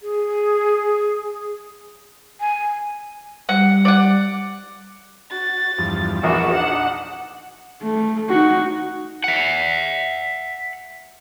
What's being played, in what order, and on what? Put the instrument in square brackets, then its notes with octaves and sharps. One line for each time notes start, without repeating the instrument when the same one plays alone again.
[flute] G#4
G#5
[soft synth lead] G3 [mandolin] F#5
[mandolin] D5 F#5
[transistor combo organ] F#4 [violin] A6
[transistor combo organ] E2 G2 F3
[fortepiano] A#1 E2 A#2 [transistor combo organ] D#4 D6 [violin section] F#4 [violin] E7
[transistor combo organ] D4 D#4 [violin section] F#5
[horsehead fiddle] A3
D#4 F#4
[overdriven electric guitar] E5 F#5